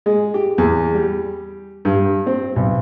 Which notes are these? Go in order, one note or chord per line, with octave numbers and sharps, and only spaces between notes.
G#3
G4
E2
G3
G2
C4
B1